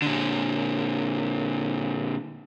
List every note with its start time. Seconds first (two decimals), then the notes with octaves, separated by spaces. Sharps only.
0.02 A#2 D3